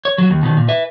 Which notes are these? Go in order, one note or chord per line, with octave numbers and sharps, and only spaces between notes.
C#5
F#3 F#4
D#2
B2 D#3
A#2
B4 E5